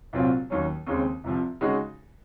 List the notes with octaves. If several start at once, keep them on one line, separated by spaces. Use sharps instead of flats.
C2 A#2 F#3 C4 F4
D#2 D#3 F#3 C#4
D#2 C#3 G#3 C4
C2 C3 F3
C#3 G#3 D#4 F#4